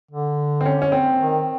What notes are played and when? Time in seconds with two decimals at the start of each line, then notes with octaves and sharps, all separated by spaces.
0.11 D3
0.61 C4
0.66 C#4
0.82 C#4
0.92 C4
1.19 D#3